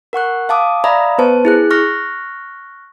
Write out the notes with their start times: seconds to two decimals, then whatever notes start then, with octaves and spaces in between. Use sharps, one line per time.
0.13 A#4 F#5 C#6 F#6
0.49 F5 A5 D6 D#6
0.84 D5 E5 F5 A#5 B5 D#6
1.18 B3 B4 C5 A5
1.45 E4 G#4 F#6
1.71 C#6 F6 F#6 A#6